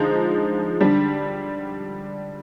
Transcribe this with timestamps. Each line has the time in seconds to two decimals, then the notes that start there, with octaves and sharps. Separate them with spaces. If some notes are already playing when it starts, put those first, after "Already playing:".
Already playing: D3 F3 G#3 D#4
0.81 D3 G3 D4